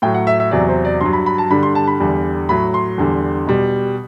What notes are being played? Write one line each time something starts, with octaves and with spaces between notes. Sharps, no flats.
A2 F#3 G5
F#5
E5
E5
E2 C3 F#3 D5
C5
D5
G2 F#3 C6
B5
B5
A5
G2 D3 G3 B5
C6
A5
B5
E2 D3 G3
A2 F#3 B5
C6
E2 D3 G3
B2 G3